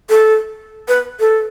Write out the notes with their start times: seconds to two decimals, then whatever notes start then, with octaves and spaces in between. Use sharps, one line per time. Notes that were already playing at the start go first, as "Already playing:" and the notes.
0.09 A4
0.88 B4
1.20 A4